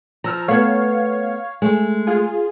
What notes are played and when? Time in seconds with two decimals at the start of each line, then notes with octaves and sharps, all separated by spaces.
0.24 F3 A#5 E6 F6
0.48 A3 B3 C#5 F5
1.62 G#3 A3
2.07 F4 G#4